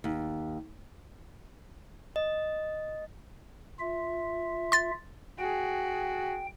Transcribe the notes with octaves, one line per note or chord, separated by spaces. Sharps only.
D#2
D#5
F4 E5
C6 A6
F#4 G#4 G5